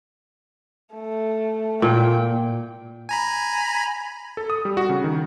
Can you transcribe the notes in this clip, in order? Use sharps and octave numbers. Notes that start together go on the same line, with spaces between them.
A3
A#2 G5
G#5 A#5 B5
A4
D#6
G3
F#4
C#3
D#3